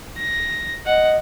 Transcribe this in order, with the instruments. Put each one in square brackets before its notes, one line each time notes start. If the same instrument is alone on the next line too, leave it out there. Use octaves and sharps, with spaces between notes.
[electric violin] A#6
[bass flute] D#5 [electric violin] F#5